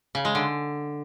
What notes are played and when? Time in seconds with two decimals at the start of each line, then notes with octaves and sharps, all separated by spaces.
0.15 C#3
0.25 G#3
0.35 D3